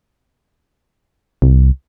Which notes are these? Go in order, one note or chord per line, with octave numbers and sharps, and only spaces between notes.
C2